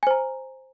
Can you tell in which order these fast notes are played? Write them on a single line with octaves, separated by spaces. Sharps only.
G#5 C5 A#5